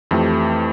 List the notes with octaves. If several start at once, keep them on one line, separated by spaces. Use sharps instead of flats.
F2 E3 A3 C4 G4